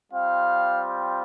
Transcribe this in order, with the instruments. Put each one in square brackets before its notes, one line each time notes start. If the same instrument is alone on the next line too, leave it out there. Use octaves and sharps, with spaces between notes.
[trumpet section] G3 C4 F4 F5